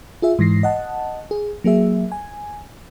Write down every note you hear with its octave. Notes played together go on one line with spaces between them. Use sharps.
F4 G#4 E5
G#2 E3 A#6 C7
D#5 F#5 A5
G#4
F#3 A#3 G#4 E5
G#5